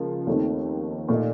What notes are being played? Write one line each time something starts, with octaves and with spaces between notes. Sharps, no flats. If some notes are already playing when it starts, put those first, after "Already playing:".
Already playing: C#2 F3 A#3 F4
D#2 D#3 A3 C4
A#2 A3 D#4